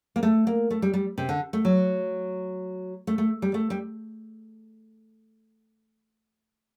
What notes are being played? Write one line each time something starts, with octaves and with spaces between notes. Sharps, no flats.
A#3
A3
A#3
A3
G3
G3
C3
D3
A3
F#3
A3
A3
G3
A3
G3